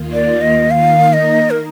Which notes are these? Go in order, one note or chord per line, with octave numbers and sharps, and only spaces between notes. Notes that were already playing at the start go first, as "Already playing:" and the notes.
Already playing: D#2 D#3 A#3 F4
D5
D#5
D#3 A#3 D#4 A#4 F5
D#5
A#4